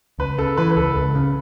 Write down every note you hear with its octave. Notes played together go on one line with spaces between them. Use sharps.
C#2 B4
C#3 A4
E3 B4
B4
C#2 A4
C#2 A4
C#3